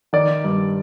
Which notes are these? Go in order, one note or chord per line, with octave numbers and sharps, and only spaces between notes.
D#3 D5
G2